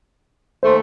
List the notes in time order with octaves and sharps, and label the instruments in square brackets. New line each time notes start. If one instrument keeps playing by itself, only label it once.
[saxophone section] D#2 A3 [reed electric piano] C5 C6